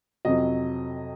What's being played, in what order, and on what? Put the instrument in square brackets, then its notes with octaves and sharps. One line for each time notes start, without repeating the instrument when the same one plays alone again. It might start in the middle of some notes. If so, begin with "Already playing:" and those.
[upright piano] F2 C3 F#3 D#5